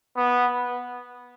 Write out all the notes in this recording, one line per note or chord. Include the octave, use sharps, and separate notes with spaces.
B3